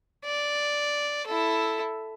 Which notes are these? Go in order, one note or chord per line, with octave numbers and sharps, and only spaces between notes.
D5
E4 A4